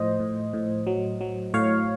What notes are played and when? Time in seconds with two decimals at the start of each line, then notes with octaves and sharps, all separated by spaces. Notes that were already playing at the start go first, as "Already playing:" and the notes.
Already playing: A2 F3 C5 D#5
0.20 A2
0.53 A2
0.87 F#3
1.21 F#3
1.54 A2 C#5 F5